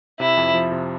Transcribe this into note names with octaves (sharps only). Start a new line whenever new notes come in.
C3 E4
F2
F3
C3